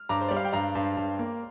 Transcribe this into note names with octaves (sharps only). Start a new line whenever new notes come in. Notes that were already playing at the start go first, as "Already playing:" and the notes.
Already playing: F6
G2 A#5 D6
C5
G3 D5
F5
G5
G2 F5 A#5
G2
G2
A#3